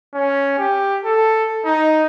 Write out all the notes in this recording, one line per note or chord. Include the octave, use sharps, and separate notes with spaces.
C#4
G4
A4
D#4